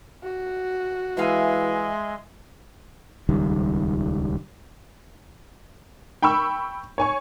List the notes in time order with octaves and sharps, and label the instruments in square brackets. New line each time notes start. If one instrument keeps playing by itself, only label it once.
[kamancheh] F#4
[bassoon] E3 [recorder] G#3 [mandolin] E5 F5 G#5
[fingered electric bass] D#1 C#2 D#3 G3
[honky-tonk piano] G5 B5 C#6 E6
C#5 G#5 C#6